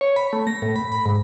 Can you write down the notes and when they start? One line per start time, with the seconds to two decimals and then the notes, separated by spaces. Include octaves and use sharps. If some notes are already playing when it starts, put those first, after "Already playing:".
0.01 C#5
0.16 B5
0.33 A3
0.47 A#6
0.62 A2
0.76 B5
0.92 B5
1.06 G#2